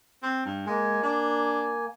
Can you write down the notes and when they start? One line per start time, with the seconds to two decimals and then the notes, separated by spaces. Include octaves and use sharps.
0.22 C4
0.45 G2
0.67 G#3 A#3 G#5
1.03 D4